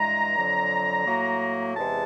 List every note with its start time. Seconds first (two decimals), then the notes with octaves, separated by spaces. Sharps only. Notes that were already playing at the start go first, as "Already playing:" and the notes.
Already playing: G2 E3 G#3 A#5
0.36 F2 D3 F#3
1.06 A2 F#3 A#3
1.76 E2 C3 E3 G#3 A5